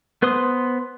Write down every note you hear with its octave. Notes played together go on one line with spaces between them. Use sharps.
B3 B4 C5 C6 D#6